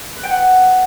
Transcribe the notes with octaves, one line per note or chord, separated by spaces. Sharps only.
B4
G5
F#5